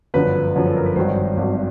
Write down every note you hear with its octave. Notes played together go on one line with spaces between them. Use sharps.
G1 F#2 D3 F3 B4
G1 F#2 D3 F3
A4
A#4
B4
G#1 G2 D#3 F#3 C5
G#1 G2 D#3 F#3